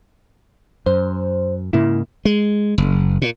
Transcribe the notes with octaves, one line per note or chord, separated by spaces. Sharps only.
F#2 C5
G#2 C#3 A#3 E4
G#3
F#1
A#2